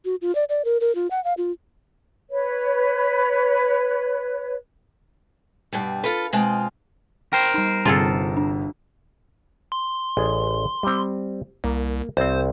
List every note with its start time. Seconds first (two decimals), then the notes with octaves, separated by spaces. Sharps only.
0.05 F#4
0.22 F4
0.35 D5
0.49 D5
0.65 A#4
0.81 A#4
0.95 F4
1.11 F#5
1.24 F5
1.37 F4
2.29 B4 C#5
5.72 G2 B2 G3
6.04 F4 A4 B4
6.33 B2 G#3 C4 F4
7.33 A#4 C5 G5
7.54 G3 D#4
7.85 G1 C3 F4 G#4 A4 A5
8.37 D4
9.72 C6
10.17 A1 G#4 D5
10.83 G3 C4
11.64 C2 A#3
12.17 C2 C4 C5